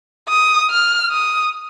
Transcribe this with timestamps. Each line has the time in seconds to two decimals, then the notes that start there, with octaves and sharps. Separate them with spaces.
0.29 D#6
0.70 F6
1.12 D#6